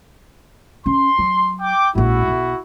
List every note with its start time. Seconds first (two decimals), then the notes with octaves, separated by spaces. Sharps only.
0.86 C#4 C6
1.19 F#3
1.61 G5 D6
1.95 A#1 G#2 E4 F#4
2.27 B1